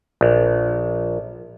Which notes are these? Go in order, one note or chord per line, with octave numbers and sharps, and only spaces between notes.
A#1